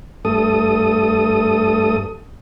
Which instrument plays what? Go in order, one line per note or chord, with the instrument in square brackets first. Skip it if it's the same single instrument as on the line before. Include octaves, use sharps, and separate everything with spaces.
[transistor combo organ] G2 A3 A4 D#6